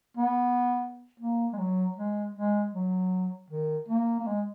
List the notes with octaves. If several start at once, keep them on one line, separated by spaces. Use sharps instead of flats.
B3
A#3
G#3
F#3
G#3
G#3
F#3
D#3
A#3
A#3
G#3